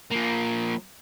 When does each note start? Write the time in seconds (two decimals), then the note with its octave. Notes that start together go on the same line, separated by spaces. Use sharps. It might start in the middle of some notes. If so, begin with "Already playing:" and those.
0.11 F3 A#3